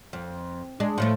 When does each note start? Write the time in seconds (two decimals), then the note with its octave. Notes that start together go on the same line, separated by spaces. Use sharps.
0.13 F2
0.80 G#3 D4
0.98 A2 F3 A3